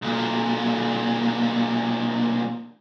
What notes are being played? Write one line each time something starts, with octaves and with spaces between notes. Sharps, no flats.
B1 A#2